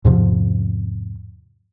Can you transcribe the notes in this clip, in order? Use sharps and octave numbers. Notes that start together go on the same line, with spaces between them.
E2 G#2 C3 F3